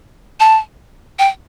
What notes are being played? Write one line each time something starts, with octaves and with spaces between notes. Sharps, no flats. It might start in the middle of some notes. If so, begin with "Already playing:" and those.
A5
G5